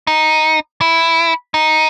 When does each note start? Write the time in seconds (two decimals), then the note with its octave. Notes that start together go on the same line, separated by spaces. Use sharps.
0.07 D#4
0.81 E4
1.54 D#4